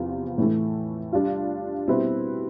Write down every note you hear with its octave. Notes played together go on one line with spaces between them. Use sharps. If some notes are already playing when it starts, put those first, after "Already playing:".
Already playing: E2 C3 F3 B3 F4
A2 E3 A3
G3 D4 F4
B2 G3 C4 E4 B4